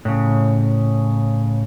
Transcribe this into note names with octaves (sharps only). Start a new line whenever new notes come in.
A2 C#3